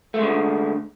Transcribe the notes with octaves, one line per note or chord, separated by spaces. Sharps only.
D3 G#3 A3